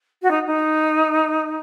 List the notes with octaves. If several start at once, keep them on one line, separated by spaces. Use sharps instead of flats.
F#4
D#4
D#4